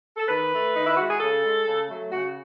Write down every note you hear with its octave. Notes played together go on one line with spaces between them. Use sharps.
A4
D#3 B4
A3
D#3 D#4
E4
G#3 F#4
G#4
C#3 A4
G#3
C#3
F#3 A3
C#3 F#4